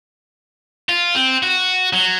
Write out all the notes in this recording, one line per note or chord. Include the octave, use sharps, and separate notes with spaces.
F4
C4
F#4
F#3